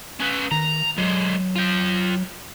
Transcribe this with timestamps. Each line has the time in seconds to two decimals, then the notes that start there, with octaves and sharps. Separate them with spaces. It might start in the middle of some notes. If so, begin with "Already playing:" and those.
0.20 C#4 B4
0.51 D#3 A#5
0.98 D3 F#3 G#3
1.56 F4 G5